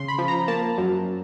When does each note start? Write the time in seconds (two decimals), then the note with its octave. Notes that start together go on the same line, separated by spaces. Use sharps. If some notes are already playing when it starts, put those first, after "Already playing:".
Already playing: C#3 C6
0.08 B5
0.18 F3
0.28 A#5
0.48 A#3 A5
0.78 F#2